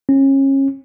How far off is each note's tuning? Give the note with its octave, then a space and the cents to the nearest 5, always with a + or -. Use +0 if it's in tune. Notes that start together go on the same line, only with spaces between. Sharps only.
C#4 -30